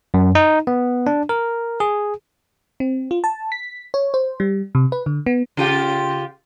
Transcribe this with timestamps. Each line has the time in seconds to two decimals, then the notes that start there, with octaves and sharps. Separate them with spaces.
0.14 F#2
0.35 D#4
0.67 B3
1.07 D4
1.29 A#4
1.80 G#4
2.80 C4
3.11 F4
3.24 A5
3.52 B6
3.94 C#5
4.14 C5
4.40 G3
4.75 C3
4.92 B4
5.06 D3
5.26 B3
5.57 C#3 F4 G4